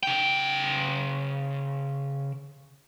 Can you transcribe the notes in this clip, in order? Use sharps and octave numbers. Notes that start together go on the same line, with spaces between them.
C#3 G5